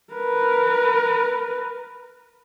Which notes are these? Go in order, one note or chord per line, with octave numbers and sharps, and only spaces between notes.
A#4 B4